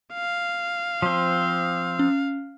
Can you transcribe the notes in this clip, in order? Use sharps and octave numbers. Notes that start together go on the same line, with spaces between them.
F5
F3 C4
C#4